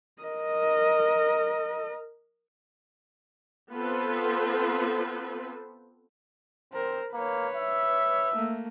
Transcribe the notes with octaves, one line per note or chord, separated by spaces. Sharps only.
A#4 D#5
B3 C4 F4 A4 B4 C5
C4 A#4 C5
A#3 B4 C#5
E5
A3 A#3